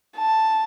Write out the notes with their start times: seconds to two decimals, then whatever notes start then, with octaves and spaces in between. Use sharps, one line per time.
0.17 A5